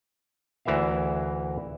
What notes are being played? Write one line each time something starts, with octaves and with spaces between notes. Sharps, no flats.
D2 E3 A#4 E5 F5